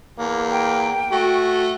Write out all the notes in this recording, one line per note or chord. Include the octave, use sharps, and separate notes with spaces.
E2 A#3
G5
A3 F#4